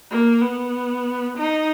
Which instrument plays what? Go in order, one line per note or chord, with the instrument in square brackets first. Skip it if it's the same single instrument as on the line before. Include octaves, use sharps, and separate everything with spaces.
[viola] A#3
B3
D#4